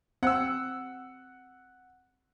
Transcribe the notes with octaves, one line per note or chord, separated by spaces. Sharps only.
C4 F#5 E6